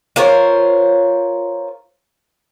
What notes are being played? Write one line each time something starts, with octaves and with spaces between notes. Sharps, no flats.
F4 A#4 C5 C#5